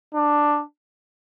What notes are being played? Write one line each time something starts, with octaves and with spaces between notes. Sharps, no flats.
D4